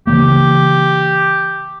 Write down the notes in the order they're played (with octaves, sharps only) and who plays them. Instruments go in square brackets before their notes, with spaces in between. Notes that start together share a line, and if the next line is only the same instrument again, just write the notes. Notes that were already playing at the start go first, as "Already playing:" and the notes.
[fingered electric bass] C#3 E3 A#3 [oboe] G4